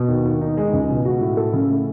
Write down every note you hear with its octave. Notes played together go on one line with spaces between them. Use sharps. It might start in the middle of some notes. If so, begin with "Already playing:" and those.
Already playing: B2
D#2
D#2
D#4
G#3
C#2
B2
F#4
A2
A4
C#3
A3